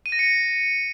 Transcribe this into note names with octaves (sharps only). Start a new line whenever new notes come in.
D#7
A#6
C#7